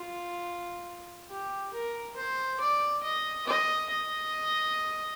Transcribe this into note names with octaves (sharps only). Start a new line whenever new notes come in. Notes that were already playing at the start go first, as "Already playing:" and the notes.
Already playing: F4
G4
A#4
C5
D5
D#5
D#5
D#5